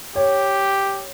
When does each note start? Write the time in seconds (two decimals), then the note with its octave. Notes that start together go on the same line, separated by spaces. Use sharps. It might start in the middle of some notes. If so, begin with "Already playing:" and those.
0.15 G4 C#5